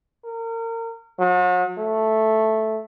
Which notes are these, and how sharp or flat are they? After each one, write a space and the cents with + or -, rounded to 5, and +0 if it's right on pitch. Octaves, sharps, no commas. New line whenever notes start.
A#4 -30
F#3 -40
A3 -5